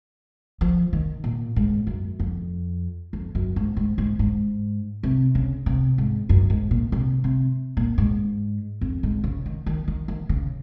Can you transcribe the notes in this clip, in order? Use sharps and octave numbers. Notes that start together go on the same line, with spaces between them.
F3
D#3
A#2
G#2
F#2
F2
F2
F#2
G#2
G#2
G#2
G#2
C3
C#3
C3
G#2
F#2
G#2
A#2
C3
C3
A#2
G#2
F2
G#2
C#3
D#3
D#3
D#3
D#3
C#3